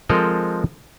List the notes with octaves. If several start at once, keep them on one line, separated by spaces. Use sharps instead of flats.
F3 G#3 C4 A4 A#4 D#5